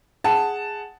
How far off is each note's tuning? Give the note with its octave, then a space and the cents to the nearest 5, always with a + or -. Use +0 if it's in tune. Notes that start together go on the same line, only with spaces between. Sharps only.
G#4 +0 F#5 +5 A5 +0